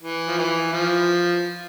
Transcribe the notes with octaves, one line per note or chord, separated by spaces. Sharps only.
E3
F3
E3
F3